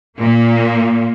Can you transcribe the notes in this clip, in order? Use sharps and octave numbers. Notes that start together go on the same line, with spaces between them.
A#2 A#3